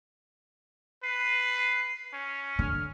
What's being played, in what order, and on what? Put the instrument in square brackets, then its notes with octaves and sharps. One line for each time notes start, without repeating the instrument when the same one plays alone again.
[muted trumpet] B4 [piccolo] C7
[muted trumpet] C#4
[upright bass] D3 [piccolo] F6